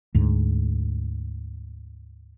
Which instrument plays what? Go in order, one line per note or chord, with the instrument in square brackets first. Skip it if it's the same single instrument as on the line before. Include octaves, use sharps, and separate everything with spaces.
[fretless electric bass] D2 G#2